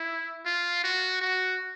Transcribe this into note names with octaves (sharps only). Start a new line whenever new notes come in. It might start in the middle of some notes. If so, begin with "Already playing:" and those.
Already playing: E4
F4
F#4
F#4